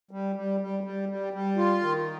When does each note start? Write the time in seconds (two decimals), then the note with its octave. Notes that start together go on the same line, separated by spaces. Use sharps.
0.11 G3
0.36 G3
0.60 G3
0.84 G3
1.09 G3
1.33 G3
1.57 F4
1.81 D#3